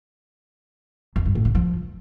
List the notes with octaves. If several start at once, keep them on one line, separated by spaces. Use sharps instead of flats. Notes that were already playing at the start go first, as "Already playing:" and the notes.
F2
G2
A2
D3
F3